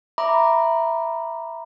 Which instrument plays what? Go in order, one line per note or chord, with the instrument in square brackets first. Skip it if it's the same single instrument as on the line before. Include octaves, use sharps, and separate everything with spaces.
[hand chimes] E5 A#5 B5 D6